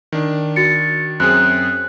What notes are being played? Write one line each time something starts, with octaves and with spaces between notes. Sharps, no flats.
D#3 D4
F#4 A6 C#7
F#2 C4 G#4 F#6